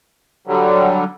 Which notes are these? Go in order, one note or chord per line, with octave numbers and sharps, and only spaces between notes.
D3 F#3 G3